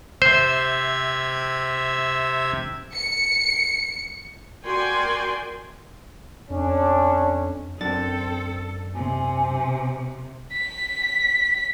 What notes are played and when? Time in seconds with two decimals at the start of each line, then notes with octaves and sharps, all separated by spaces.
0.22 C3 C5 E5 G#6
2.93 C#7
4.64 F#4 A#4 D5 G5 G#5 C6
6.50 F2 C#4 D4
7.81 F#2 C4 D4 A4 A6
8.95 C3 G#5
10.52 B6